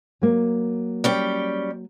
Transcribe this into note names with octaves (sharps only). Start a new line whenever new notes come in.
F#3 A#3
G3 C#4 G5